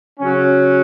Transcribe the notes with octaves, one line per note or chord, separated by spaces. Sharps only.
C#3 F#3 C#4